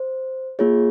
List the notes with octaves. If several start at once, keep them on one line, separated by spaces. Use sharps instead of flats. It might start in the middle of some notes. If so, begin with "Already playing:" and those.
Already playing: C5
A#3 F4 G#4 C#5